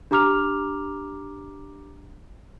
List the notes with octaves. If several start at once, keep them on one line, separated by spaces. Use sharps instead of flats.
D4 G4 A#5 D6 F6 F7